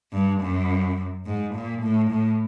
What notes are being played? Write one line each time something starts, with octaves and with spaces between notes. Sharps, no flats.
G2
F#2
G#2
A#2
A2
A2